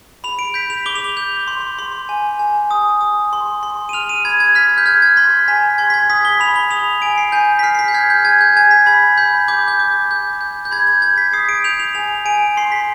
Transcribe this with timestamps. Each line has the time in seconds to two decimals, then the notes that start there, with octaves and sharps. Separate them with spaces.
0.24 B5 F7
0.39 D7
0.54 G6 B6
0.70 F7
0.86 D6 G7
0.95 F7
1.04 G7
1.17 G6 F7
1.48 C6
1.79 C6
2.09 G#5
2.39 G#5
2.71 D#6
3.01 D#6
3.33 C6
3.63 C6
3.89 D#7
3.93 F6 F7
4.09 D#7
4.25 B5 G#6
4.40 G#6
4.55 F6 B6
4.78 G6
4.86 F6 G#6
5.02 G#6
5.17 C6 B6
5.48 G#5 B6
5.78 C6 G#6
5.90 B6
5.94 G#6
6.10 D#6 B6
6.25 G7
6.40 B5 F7
6.56 G7
6.71 D#6 F7
7.02 G#5 D7
7.18 C7
7.32 G#5 G6
7.59 B6
7.63 F6 C7
7.75 C7
7.79 B6
7.88 G6
7.94 F6 G#6
8.10 G6
8.25 G#5 G#6
8.41 G6
8.56 G#5 G#6
8.71 B6
8.86 B5 G#6
9.18 B5 G6
9.48 D6 G6
9.68 G6
9.79 D6
10.11 G6
10.41 G6
10.65 G6
10.71 B5 G#6
10.87 G6
11.02 G6 G#6
11.18 B6
11.33 D#6 C7
11.49 D7
11.64 G6 F7
11.80 F7
11.95 G#5 F7
12.25 G#5 D7
12.57 C6 C7
12.72 B6